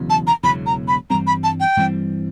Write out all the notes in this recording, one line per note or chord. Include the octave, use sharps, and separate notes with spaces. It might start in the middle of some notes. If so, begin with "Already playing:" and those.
Already playing: E1 E2 C#3 F#3
A5
A#5
E1 E2 C#3 F#3 B5
A#5
B5
G2 E3 G3 C4 A#5
B5
A5
G5
G2 E3 G3 C4